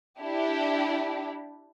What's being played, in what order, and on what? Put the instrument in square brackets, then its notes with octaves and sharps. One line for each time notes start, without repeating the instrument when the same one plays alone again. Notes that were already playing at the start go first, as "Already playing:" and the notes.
[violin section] D4 E4 G4